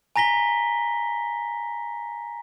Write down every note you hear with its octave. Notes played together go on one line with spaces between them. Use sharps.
G#5 A#5 A#6 B6 G7